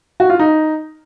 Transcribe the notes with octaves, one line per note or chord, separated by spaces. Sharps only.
F#4
F4
D#4